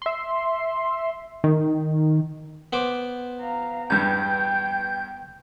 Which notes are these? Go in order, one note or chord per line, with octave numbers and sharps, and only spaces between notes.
E5 C6
D#3
B3 C5 D6
F5 A#5
E2 G2 G5 G6